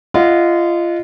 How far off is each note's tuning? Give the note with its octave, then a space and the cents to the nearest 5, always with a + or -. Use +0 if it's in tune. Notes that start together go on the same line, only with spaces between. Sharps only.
F4 -25 D#5 -10 F#5 -25